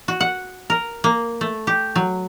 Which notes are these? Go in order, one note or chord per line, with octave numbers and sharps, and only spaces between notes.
F#4
F#5
A#4
A#3
A3
G4
F#3